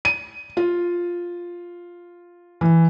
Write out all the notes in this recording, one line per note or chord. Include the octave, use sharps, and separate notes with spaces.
D#7
F4
E3